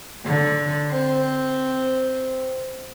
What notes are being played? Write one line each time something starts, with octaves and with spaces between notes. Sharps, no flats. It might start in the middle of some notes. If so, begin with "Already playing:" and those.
D3
C4